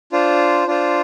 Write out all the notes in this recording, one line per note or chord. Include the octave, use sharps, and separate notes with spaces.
D4 F4 C5
D4 F4 C5